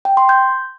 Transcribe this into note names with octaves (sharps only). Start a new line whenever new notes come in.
G5
C6
G6